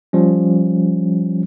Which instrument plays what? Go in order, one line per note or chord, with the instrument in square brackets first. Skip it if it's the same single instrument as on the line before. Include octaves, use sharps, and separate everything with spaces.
[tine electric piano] F3 G3 C#4